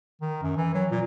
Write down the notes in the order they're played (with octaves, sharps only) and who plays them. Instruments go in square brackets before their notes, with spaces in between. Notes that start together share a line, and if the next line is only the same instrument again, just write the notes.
[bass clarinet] D#3
F#2
E3
F#3
A#2